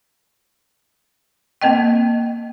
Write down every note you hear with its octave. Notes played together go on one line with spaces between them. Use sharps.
A#3 C4 D#5 G5